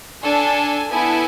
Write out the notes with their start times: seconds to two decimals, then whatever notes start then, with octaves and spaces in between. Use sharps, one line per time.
0.22 D4 A4 G#5
0.90 B3 E4 A4 G#5